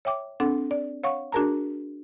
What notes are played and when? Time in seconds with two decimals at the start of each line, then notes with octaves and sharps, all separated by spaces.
0.05 C#5 E5 G5 D6
0.40 C4 D4 A4 F#5
0.71 D5
1.04 C#5 F5 F#5 C#6
1.32 D4 F#4 G#4 A#4 A5 A#5